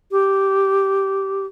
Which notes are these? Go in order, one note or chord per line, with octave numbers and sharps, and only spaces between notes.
G4